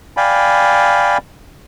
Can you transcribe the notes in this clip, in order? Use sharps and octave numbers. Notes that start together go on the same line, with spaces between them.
D5 F5 G5 G#5 B5